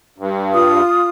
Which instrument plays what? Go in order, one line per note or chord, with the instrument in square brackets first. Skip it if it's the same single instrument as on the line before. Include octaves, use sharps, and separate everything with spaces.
[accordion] G2
[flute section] F4 D#6